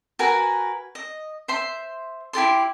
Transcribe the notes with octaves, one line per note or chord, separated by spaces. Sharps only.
F#4 A#4 B4 G#5
D#5
C5 E5 C6
E4 G4 A4 C6